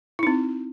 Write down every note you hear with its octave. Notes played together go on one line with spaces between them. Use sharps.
C4 D#4 E4